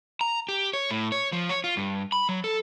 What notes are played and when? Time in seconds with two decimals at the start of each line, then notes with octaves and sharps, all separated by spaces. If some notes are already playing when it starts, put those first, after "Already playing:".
0.21 A#5
0.49 G4
0.73 C#5
0.91 A2
1.12 C#5
1.32 F3
1.49 C#5
1.64 F4
1.77 G2
2.12 B5
2.29 F#3
2.44 A4